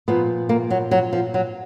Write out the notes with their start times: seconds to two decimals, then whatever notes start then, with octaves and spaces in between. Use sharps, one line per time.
0.08 A#2 F3 B3
0.49 A#3
0.70 F#3
0.91 F#3
1.13 F3
1.34 F#3